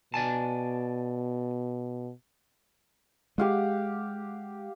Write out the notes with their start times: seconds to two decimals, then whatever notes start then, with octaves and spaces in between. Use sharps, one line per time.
0.14 B2 D5 G#5 A5
3.38 G#3 G4 F5 F#5